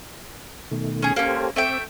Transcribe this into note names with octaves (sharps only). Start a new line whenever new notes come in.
B2 D#3 A3
C#4 G#4
A#3 C#4 G4 A4 C5
A3 C4 E5 G5 D6 E6